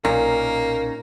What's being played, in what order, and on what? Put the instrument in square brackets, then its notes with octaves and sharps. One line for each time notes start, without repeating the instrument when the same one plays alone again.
[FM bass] B1 [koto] A#2 [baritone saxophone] A#3 [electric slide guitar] C#4 D#4